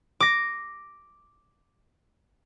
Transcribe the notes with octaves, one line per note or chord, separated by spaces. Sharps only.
D6 A#6